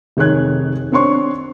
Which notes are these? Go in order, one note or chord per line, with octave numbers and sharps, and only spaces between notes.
F1 D#3 G#4 C#5 F#6 G#6
C4 D4 C#5 C6 C#6